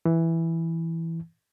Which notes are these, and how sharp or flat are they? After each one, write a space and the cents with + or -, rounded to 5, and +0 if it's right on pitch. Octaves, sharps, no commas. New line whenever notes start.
E3 +0